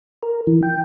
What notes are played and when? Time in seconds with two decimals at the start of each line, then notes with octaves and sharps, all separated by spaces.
0.23 A#4
0.47 E3
0.63 G5